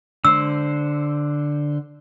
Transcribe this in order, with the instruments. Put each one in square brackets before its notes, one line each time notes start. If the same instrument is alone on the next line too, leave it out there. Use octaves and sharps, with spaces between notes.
[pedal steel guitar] D3 C5 [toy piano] E6